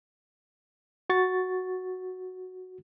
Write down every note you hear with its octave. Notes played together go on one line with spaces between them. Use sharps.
F#4 C#6 A6